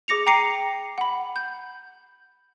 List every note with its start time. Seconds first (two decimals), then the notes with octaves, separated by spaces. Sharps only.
0.08 G#4 D6 A#6 C#7 F7
0.26 G5 A#5 D6 C7 C#7 D#7
0.98 F#5 B5
1.36 G6